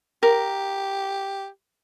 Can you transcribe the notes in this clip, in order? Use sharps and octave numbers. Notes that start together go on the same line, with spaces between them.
G4 A#4